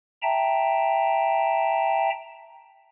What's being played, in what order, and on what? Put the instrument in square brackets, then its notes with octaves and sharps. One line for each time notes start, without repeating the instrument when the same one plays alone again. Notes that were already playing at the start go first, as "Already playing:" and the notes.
[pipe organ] E5 G5 A5 A#5